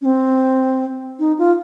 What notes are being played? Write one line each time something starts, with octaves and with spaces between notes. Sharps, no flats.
C#4
C4
D#4
F4